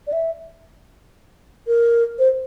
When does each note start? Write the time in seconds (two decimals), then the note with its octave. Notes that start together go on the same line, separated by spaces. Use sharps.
0.07 D5
0.13 E5
1.67 A#4
2.19 C5